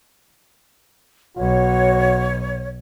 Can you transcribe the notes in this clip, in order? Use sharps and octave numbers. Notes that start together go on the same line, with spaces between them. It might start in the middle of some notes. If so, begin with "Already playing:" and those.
B1 F#4 C#5